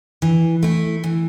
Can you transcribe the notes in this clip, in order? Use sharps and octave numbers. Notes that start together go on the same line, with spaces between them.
E3
A3 E4
E3